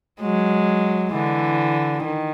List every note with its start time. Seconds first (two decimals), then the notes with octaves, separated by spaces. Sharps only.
0.21 F#3 G#3
1.12 D3 E3
2.03 D#3